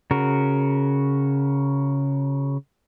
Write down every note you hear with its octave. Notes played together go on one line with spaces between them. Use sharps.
C#3 F#4 A#4